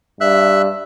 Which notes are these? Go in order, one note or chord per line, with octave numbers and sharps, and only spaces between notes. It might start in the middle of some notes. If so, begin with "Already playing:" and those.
G2 E5 E6 F#6